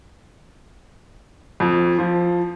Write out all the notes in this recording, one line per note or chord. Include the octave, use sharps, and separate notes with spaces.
F2
F3